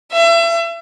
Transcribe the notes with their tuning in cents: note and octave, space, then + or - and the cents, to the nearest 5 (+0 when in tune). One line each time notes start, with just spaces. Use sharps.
E5 +35